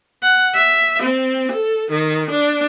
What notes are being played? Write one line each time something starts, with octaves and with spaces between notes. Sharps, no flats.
F#5
E5
C4
A4
D#3
D4